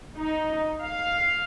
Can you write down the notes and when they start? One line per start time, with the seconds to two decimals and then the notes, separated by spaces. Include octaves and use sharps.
0.16 D#4
0.81 F5